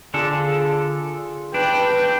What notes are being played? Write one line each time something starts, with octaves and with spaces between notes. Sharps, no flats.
D3 D4 F4 G#4 A4
D4 B4 G5